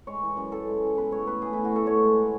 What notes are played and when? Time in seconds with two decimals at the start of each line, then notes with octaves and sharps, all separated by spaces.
0.07 G#3 C#5
0.22 E3
0.37 F#2
0.52 F#2 A4
0.67 G#3
0.82 E3
0.97 B2 B4
1.12 A3 C#5
1.27 B2 B4
1.42 A3 G#4
1.53 B2 E4
1.65 F#4
1.72 A3 A4
1.86 A2 C#5
2.02 G#3
2.17 A2